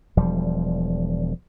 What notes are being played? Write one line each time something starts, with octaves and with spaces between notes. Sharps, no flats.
E1 F3 G3